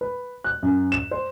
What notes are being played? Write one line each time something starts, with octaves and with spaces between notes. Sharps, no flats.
B4
F#6
F#2
E7
C5